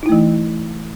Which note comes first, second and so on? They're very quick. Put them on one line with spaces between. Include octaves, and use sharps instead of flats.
D#4 E4 A3 E3